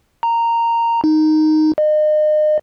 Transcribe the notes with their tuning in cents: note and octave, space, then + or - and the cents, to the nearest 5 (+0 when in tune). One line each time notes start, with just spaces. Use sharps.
A#5 -10
D#4 -5
D#5 -35